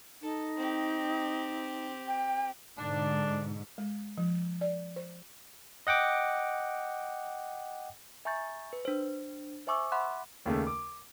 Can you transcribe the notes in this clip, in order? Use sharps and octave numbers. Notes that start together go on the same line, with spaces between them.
D#4 A4
C4 G4
G5
G#2 B2 D3 D4
G#3
F3
D5
C5
D#5 F#5 G5 D6
E5 G#5 A#5 C#6 G6 A6
B4
D4 C5
C5 E5 G#5 C#6 D6 E6
E5 F#5 B5 C6 D6 F#6
D#2 C#3 A3
D6